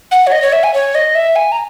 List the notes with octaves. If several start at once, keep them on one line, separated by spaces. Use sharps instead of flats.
F#5
C#5
D#5
C#5
E5
G#5
C#5
D#5
E5
G#5
A#5